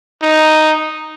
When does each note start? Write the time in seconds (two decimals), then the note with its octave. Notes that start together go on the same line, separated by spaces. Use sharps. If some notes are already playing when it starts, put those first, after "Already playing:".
0.22 D#4